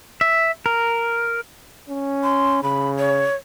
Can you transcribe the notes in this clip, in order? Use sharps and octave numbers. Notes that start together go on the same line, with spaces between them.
E5
A#4
C#4
C6
C#3 B5
C#5